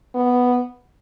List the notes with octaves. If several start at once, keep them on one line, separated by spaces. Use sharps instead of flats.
B3